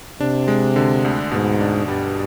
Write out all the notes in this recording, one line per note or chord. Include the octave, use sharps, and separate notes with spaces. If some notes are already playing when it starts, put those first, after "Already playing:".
C3 D4
G#3
D3
D2
G#2 B2
D4
G2 G3